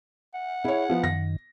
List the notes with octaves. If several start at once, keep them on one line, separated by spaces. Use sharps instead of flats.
F#5
E4 G#4 C#5
F3 B3
F#2 D#3 A#6